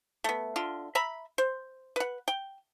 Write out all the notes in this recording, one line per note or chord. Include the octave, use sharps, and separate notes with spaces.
A3 B3
D3 F4
E5 A#5 B5
C5
B4 F#5
G5